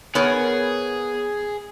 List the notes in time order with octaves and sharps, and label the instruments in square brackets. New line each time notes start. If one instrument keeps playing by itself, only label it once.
[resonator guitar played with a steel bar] B3 A#4 C#5 [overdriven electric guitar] G#4